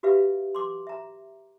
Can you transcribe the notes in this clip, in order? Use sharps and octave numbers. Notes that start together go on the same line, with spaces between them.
F#4 G4 B4 E5 F5
C6 D6
E5 A#5